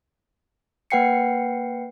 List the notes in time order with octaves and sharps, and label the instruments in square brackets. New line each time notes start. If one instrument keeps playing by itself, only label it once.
[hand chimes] A#3 B4 F#5 G5 C7 C#7